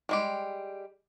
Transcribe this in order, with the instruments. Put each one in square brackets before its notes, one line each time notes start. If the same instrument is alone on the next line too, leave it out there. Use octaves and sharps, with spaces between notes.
[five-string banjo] G3 G#3 G4